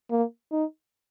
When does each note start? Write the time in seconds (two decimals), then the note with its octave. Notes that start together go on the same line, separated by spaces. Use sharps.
0.11 A#3
0.52 D#4